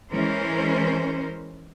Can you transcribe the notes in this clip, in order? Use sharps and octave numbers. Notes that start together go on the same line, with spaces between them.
E3 G#3 C#4 A#4 C5